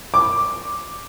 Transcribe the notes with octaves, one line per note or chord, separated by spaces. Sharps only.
D6